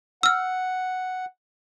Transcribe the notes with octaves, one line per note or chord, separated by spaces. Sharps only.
F#5 E6 F6